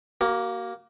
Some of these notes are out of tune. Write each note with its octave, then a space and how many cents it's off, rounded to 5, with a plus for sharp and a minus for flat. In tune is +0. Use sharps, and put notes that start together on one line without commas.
A#3 +5 F#4 +40